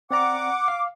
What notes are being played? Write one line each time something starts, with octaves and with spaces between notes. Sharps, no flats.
C4 D5 F#5 A#5 D6
F5